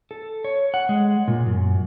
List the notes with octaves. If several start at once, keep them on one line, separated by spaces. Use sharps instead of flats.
A4
C#5
F#5
G#3
A#2
F#2